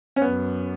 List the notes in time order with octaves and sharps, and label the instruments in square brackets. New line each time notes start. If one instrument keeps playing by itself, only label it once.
[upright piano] C#4
[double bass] F#2 [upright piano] B3